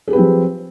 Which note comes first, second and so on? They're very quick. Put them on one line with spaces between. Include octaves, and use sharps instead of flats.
G#4 G4 B4 C4 F3